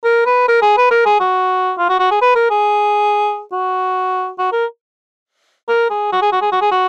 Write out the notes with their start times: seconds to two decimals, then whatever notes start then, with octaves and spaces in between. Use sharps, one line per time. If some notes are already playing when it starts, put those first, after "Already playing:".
0.04 A#4
0.26 B4
0.48 A#4
0.62 G#4
0.77 B4
0.91 A#4
1.05 G#4
1.20 F#4
1.78 F4
1.89 F#4
2.00 F#4
2.11 G#4
2.21 B4
2.35 A#4
2.50 G#4
3.52 F#4
4.38 F#4
4.52 A#4
5.68 A#4
5.90 G#4
6.12 F#4
6.22 G#4
6.32 F#4
6.41 G#4
6.52 F#4
6.61 G#4
6.71 F#4